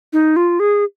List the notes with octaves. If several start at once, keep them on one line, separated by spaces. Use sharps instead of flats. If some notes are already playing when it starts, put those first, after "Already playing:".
D#4
F4
G#4